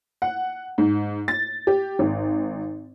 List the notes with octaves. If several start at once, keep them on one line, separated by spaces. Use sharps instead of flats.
F#5
G#2
A6
G4
G#1